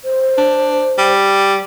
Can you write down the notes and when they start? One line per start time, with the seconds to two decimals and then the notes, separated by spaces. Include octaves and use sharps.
0.05 C5
0.37 D4
0.98 G3